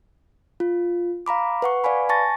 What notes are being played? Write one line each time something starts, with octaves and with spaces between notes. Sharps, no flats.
F4
F5 A#5 B5 D6
B4 F#5 C#6
B4 D5 F5 G#5 B5
G#5 A5 C#6 A6 A#6